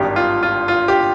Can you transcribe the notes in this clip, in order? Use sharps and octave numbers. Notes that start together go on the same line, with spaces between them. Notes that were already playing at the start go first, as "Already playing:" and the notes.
Already playing: G#1 G2 D#3 G3 G4
F4
F4
F4
G4